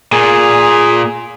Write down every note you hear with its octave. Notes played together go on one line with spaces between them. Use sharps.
A#2 G#4